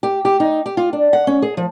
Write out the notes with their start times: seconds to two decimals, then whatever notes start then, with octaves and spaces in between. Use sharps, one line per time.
0.03 G4
0.25 G4
0.40 D#4
0.66 G4
0.77 F4
0.93 D4
1.13 F#5
1.27 C#4
1.42 G#4
1.57 F3